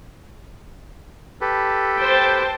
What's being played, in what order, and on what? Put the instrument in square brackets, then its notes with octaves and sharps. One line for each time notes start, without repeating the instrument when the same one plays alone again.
[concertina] G4 A4 B4
[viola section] C5 G5 A5